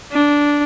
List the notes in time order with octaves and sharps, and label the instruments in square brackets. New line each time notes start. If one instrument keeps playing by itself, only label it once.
[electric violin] D4